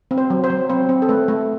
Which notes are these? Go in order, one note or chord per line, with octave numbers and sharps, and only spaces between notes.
C4
C5
F#3
C5
F#3
C4 C5
C4
A4
A3 B4
A3